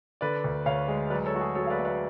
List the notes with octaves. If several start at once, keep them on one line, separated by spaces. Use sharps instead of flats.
D3 B4 D5
D2
D2 C#5 F5
G#3
F#3 B4 D5
A4 C#5
A3 F#4
G#4
F#3 A4 C#5
F5
B4 D5
A3
B4 D5